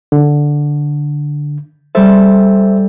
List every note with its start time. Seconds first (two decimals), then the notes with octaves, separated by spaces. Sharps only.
0.12 D3
1.95 G3 A4 C5 E5